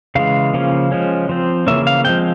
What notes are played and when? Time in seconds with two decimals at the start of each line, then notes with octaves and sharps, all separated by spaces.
0.15 C#3 E3 G#3 F5
0.54 C#3 F3 A#3 C#4
0.92 F3 G#3 C#4
1.29 F3 C4
1.67 C#3 E3 A#3 C#4 E5
1.87 F5
2.05 F3 G#3 C4 G5